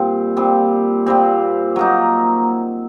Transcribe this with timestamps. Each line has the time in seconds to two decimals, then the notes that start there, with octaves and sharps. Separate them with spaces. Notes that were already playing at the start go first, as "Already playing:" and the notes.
Already playing: A#2 G3 C4
0.37 A#2 G3 C4
1.06 A#2 G3 C4
1.76 F#3 A#3 D#4